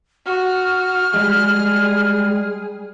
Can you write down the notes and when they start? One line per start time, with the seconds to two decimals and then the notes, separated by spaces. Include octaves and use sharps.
0.26 F#4 F6
1.14 G3 G#3 G#4